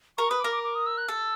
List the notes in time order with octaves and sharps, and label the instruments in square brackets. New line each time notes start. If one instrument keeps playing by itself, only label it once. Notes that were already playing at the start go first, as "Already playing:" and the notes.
[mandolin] A#4 [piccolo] C#6
[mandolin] B4 [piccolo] D#6
[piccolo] D6
[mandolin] A#4
[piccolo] D6
D6
D#6
E6
F#6
[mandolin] A4 [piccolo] E6